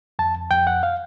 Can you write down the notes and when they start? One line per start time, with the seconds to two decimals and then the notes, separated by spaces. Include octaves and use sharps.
0.19 F2 A5
0.51 F2 G5
0.67 F#5
0.83 F5